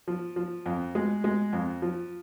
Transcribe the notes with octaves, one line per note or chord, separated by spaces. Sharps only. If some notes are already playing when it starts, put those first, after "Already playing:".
F3
F3
F2
G#3
G#3
F2
F3